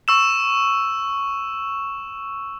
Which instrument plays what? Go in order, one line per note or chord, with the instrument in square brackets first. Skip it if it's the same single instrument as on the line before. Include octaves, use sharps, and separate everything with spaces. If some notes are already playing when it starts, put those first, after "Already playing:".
[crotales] C#6 E6 E7